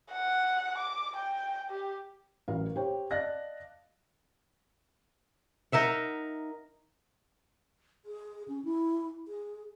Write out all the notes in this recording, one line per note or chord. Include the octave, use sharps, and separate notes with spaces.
F#5
D6
G5
G4
A1 F#3 A#4 F5
G4 C5 C#5 G5
D5 D#5 F5 A5 F#6 A#6
D#4 A#4 E5 F#5
G#4
C#4
E4
G#4